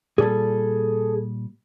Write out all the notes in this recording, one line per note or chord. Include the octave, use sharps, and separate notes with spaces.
A#2 G3 G#4 A4